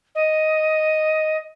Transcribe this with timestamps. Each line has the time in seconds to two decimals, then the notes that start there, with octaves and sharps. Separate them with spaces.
0.15 D#5